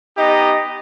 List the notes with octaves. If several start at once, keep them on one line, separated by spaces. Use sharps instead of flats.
B3 D#4 G4 D#5